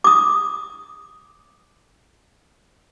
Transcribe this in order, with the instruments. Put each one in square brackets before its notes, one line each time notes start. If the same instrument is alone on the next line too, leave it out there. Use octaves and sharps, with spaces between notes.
[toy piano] D6 D#6